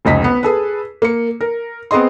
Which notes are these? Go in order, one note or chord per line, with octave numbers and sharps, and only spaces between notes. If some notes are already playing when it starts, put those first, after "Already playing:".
F1 C#2 D#5 B6
B3
G#4 A4 B4
A#3 C#7
A#4
B3 C4 G#4 D#5 C6